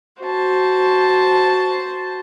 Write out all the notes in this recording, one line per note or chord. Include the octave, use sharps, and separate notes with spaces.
F#4 C5 A5